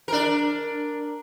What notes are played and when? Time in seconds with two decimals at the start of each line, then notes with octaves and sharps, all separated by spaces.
0.08 D4 A#4